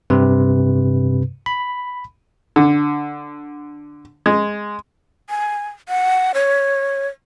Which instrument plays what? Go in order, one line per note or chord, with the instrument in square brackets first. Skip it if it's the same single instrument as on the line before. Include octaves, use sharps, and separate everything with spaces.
[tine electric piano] G2 C3 B4
B5
[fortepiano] D3
G#3
[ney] G#5
F#5
C#5